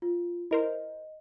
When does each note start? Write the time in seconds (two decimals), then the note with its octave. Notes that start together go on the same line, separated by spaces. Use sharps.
0.02 F4
0.51 E4 A#4 C5 D#5